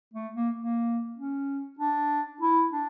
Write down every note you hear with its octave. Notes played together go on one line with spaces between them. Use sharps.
A3
A#3
A#3
C#4
D4
E4
D4